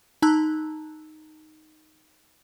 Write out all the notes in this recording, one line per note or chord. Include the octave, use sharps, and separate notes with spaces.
D#4 A5 A#5 E6 F#6